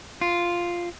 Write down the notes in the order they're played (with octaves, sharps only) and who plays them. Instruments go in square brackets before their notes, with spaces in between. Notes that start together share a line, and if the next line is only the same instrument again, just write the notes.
[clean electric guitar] F4